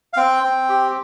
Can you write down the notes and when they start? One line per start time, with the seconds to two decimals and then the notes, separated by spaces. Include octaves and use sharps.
0.13 F5
0.17 C4 G5
0.44 C4
0.69 G4